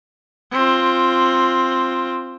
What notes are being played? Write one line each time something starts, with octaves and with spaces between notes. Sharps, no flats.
C4 F4